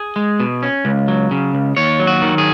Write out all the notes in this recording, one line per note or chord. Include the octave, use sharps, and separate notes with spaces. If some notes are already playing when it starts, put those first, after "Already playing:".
Already playing: G#4
G#3
B2
C#4
C#2
F#3
C#3
C#2
D#2 C#5
F#3
F#4
D#3
G#4